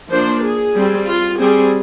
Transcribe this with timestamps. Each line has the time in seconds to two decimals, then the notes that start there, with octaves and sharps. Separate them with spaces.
0.10 F3 A#3 D4 C5
0.43 G#4
0.75 G3 C4
1.07 F4
1.39 G3 C4 G#4